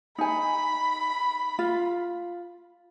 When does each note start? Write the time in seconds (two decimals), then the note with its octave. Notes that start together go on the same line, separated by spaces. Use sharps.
0.18 D#4 G#5 B5
1.59 F4